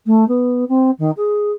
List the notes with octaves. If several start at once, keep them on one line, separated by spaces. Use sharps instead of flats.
A3
B3
C4
D#3
G#4